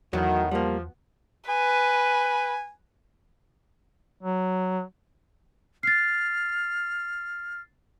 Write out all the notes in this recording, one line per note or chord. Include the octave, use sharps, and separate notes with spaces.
E2 A2 D#3 F#3 B3 F#4 F#5
F3 G3 A#3
B4 G#5
F#3
F6 A6 C7